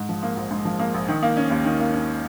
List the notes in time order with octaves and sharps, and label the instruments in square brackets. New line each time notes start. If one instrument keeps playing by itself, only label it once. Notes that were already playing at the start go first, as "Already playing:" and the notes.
Already playing: [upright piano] G#2
F3
A#3
A#1
G#2
F3
A#3
A#1
D#3
A#3
C#4
D#2
D#3
A#3
C#4